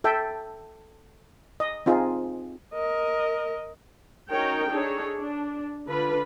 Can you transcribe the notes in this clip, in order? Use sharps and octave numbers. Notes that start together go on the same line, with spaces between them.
A4 E5 G5
D#5
C4 D#4 F4 G#4
A#4 D#5
C#4 D#4 F#4 A#4 C#5 G5
D4 D#4 G#4 A4 C#5
D4
D3 F4 B4 B5